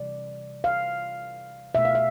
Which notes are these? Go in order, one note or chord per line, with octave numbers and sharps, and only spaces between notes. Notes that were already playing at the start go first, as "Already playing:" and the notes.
Already playing: C3 E3 G3 D5
F5
B2 A3 E5
F5
E5